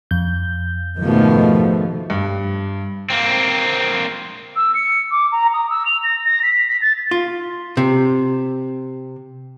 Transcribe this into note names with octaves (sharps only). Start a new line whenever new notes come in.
F2 G6
G#2 B2 D#3 F3 A3
G2
A#3 C4
E6
C#7
D6
A#5
D#6
E6
F7
A#6
A#6
B6
B6
A6
F4
C3